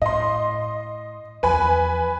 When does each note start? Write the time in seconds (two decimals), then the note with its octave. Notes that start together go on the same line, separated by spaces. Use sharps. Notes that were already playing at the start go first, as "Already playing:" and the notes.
0.02 A2 D#5 C6
1.43 E2 F3 B4 G#5 B5